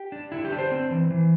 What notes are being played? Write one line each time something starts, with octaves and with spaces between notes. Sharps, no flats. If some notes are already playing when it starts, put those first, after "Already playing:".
Already playing: G4
D4
D3 E4
G4
D4
C5
C4
E3
E3